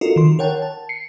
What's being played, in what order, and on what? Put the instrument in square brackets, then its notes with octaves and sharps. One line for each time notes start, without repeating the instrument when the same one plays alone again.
[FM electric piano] F4 F#4 A4 A#4 D#5
D#3 C6
A#4 C#5 F#5 G5 A5
A5
C7 C#7